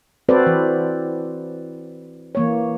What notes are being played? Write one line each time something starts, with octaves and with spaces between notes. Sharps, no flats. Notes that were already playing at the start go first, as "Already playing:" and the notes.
C4 F#4 A4 B4 C5 D5
E3
E3 A#3 C#5